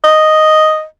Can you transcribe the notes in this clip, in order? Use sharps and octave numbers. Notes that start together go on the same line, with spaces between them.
D#5